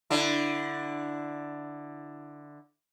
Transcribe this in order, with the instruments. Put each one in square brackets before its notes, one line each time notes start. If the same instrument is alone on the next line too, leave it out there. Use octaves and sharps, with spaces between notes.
[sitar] D3 E4